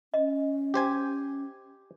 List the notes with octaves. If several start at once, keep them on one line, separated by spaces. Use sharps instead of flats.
C#4 D#5
G4 C5 G#5